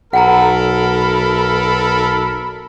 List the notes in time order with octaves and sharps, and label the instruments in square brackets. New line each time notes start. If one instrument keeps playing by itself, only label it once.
[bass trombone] B1 [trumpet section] A4 A#4 B5 [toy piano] F#5 G#5 A#5